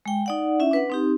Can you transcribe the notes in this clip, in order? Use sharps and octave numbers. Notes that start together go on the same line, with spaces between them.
G#3 G5
D#4 D5 F#5
C#4 E4 E5
D4 B4 F#5
C4 D#4 G4